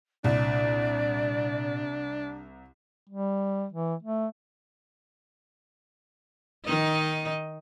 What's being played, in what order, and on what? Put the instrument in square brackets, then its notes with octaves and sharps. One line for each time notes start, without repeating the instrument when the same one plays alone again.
[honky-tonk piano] C2 [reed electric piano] A#2 [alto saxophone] D4 [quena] D5
[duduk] G3
E3
A3
[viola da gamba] D#3 D#4 D#5